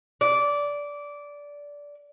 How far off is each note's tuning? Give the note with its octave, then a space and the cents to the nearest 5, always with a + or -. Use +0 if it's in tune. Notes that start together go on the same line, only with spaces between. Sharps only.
D5 -15